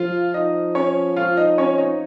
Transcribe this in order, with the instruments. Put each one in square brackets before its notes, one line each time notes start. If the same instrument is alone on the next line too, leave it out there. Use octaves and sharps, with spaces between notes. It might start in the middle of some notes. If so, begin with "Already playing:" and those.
Already playing: [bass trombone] F3 [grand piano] F4 F5
[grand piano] D#4 D#5
C#4 C#5
F4 F5
D#4 D#5
C#4 C#5
D#4 D#5